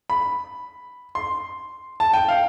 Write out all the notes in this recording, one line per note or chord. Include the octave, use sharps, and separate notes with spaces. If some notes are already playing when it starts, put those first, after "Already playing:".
B5
C6
A5
G5
F5